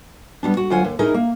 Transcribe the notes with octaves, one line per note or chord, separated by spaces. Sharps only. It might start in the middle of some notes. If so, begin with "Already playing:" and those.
G3 B3 D4
F#4
D2 F#3 F4 F#5 G#5
D#2
C#4 D#4 E4 G#4 A#4 D#5
A#3